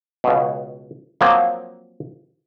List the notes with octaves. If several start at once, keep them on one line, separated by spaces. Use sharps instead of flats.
C#2 B2
F3 F#3 A#3 C4